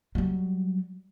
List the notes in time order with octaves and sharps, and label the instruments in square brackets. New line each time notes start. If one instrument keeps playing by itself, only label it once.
[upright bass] F#3 G3